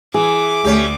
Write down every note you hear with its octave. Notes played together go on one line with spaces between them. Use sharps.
E3 G#4 D6
D2 A3 C#4 G4